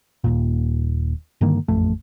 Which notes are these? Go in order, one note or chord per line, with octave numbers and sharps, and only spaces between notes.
D#1 D#2 A#2
G2 D3 D#3 A#3
E1 A1 F2 A3